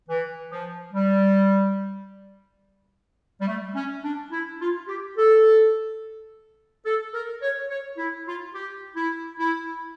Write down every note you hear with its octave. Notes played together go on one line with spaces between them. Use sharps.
E3
F3
G3
G3
A3
C#4
D4
E4
F4
G4
A4
A4
A#4
C#5
C#5
E4
F4
G4
E4
E4